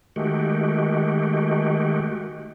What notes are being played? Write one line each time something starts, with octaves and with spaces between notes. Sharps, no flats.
D#3 G#3 A3 F#4 G4